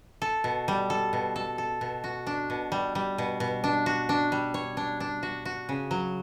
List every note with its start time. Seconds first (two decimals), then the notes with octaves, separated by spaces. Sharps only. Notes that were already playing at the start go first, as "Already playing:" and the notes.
0.22 A4
0.44 B2
0.68 G3
0.90 A4
1.13 B2
1.36 A4
1.58 A4
1.81 B2
2.04 F#4
2.27 D4
2.50 B2
2.72 G3
2.95 G3
3.18 B2
3.40 B2
3.64 D4
3.86 F#4
4.09 D4
4.32 G3
4.54 C#5
4.77 D4
5.00 D4
5.23 F#4
5.45 F#4
5.69 C#3
5.91 F#3